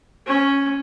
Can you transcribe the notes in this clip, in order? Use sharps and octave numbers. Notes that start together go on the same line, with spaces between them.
C#4